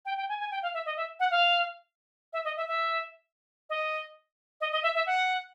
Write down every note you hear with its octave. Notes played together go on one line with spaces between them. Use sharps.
G5
G5
G#5
G#5
G5
F5
E5
D#5
E5
F#5
F5
E5
D#5
E5
E5
D#5
D#5
D#5
E5
E5
F#5